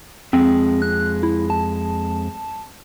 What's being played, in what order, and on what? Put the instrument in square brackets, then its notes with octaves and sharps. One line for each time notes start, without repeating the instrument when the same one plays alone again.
[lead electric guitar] F2 G#3 [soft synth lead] C4
[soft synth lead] F#6
E4
A5